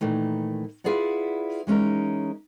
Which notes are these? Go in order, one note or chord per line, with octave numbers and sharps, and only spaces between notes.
A#2 D#3 E3 A3
E4 F4 G#4 B4 D5 F#5
E3 G#3 C#4 D#4 A#4